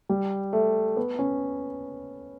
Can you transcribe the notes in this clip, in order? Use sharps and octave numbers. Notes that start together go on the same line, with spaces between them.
G3
A3
B3
C#4